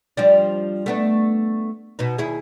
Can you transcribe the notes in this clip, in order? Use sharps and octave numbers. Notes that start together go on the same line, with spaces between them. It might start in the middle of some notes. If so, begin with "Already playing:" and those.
F3 G3 D4
A3 B3 D4
B2 B3 D#4
D#2 E4 G#4